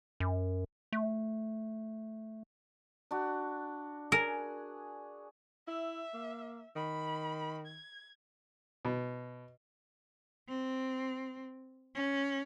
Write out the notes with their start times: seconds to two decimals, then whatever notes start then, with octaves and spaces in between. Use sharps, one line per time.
0.20 F#2
0.93 A3
3.11 D4 F#4
4.12 G#4 A#4
5.68 E4 E5
6.14 A#3
6.76 D#3 B5
7.66 G#6
8.85 B2
10.49 C4
11.95 C#4